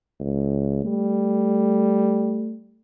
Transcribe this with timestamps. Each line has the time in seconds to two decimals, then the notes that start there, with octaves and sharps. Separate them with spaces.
0.20 C#2
0.85 G3 A3